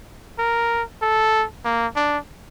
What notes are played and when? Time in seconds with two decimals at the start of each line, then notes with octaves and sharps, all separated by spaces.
0.38 A#4
1.01 A4
1.65 A#3
1.96 D4